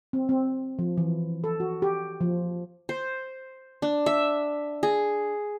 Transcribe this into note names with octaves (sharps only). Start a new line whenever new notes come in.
C4
C4
F3
E3
A4
F#4
G4
F3
C5
D4
E5
G#4